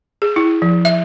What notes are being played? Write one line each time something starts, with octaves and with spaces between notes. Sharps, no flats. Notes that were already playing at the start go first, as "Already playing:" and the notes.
G#4
E4
F3
E5